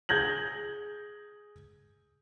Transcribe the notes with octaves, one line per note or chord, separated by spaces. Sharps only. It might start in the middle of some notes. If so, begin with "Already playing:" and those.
G#4 G6 G#6 A#6 F#7